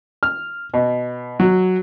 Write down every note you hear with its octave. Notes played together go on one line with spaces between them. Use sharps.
F6
B2
F#3